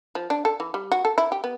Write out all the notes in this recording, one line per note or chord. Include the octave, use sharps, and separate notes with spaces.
F3
D4
A4
E3
G3
F#4
A4
E4
G4
B3